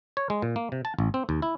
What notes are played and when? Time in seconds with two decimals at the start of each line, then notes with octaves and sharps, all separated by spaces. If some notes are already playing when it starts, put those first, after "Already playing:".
0.17 C#5
0.30 G#3
0.42 A#2
0.56 A#3
0.72 C3
0.85 A5
0.99 A1
1.14 C4
1.29 D#2
1.42 E4